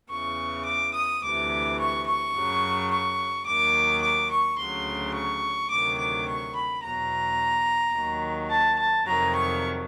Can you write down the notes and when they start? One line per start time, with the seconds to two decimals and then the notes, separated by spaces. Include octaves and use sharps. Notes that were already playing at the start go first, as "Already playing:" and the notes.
0.10 E2 C#3 E3 C#6
0.66 D6
0.94 D#6
1.23 D2 C3 E3 D6
1.78 C#6
2.06 C#6
2.34 F#2 C#3 F#3
2.90 C#6
3.46 D#2 D#3 F#3 D6
4.02 D6
4.31 C#6
4.59 D2 C#3 F#3 C6
5.14 C#6
5.71 D2 C3 D#3 F#3 D6
5.98 D6
6.27 C#6
6.55 B5
6.82 E2 B2 F#3 A#5
7.94 D#2 D#3 F#3
8.50 A5
8.79 A5
9.06 F2 C3 D#3 F#3 A#5
9.35 C#6